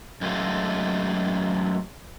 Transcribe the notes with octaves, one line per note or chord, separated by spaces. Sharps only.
F#2 G#3 A3 F4